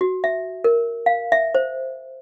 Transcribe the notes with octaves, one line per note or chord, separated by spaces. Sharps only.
F#4
E5
A#4
F5
E5
C5